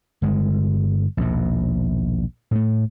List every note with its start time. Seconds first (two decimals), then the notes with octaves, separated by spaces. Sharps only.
0.22 G1 G#3
1.17 A#1 D#2 B2
2.51 A2 A3